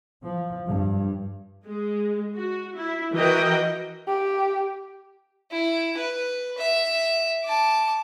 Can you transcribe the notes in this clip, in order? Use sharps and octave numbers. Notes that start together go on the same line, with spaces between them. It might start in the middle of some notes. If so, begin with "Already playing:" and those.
F3
G2
G#3
F#4
E4
E3 F#4 A#4 D#5 G5
G4
E4
B4
E5
A5 D6